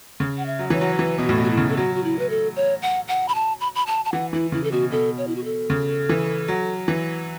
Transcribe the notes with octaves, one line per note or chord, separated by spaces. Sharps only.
C#3
F#5
E5
F#3
E3 C#5
F#3
E3 B4
B2
A2 F#4
B2
F#4
E4
C#3
A4
F#3 F#4
F#4
E4
B4
A4
C#5
F#5
F#5
B5
A5
B5
B5
A5
A5
E3 F#5
E3 E4
C#3 E4
A4
B2 F#4
B2 A4
C#5
E4
F#4
A4
C#3
E3
F#3
E3